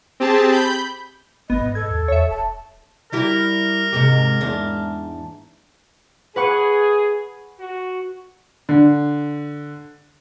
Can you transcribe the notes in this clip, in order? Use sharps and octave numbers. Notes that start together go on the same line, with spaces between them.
C4 G4 G#4 A5
B5 G6
G1 B3 D#5
G#2
A4 G#6
D#2
E2 C#5 E5
D#1 A5
G3 E4 G4 A#4
G#2 C3 G4
E2 G#2 D4
G#4 B4 F#5 C#6
F#4
D3